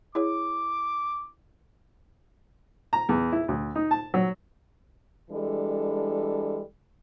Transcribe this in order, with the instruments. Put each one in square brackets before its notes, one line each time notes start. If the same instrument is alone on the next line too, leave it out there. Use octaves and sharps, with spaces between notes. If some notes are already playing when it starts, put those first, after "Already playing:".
[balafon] E4 G#4 C#5 [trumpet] D6
[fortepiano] A#5
E2
E4
D2
D#4
A5
F#3
[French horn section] E3 G3 G#3 D4 A4